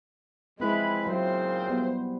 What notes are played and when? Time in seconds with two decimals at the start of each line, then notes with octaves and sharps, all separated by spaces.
0.60 F3 G#3 C4 E4 B4 B5
1.07 A#2 C#3 F#3 C4 C5
1.69 G3 B3